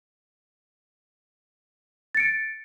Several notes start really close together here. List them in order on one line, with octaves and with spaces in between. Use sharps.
A6 C#7 D7